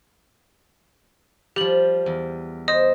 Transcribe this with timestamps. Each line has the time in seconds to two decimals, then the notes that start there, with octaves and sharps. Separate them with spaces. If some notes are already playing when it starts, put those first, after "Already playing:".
1.56 F3 G3 G4 F#7
2.06 E2
2.68 C5 D#5 D#6